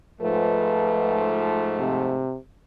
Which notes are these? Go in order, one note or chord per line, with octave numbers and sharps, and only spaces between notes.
G#2 F3 A3 B4
C3